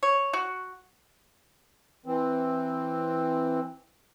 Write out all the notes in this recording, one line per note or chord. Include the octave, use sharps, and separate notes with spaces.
C#5
F#4
E3 C4